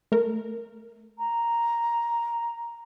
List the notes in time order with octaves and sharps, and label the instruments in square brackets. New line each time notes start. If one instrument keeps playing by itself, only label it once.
[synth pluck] A3 A#4
[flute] A#5